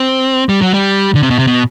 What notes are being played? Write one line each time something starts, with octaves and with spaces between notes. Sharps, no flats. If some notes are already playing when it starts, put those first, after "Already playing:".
Already playing: C4
G3
F#3
G3
D3
C3
B2
C3
B2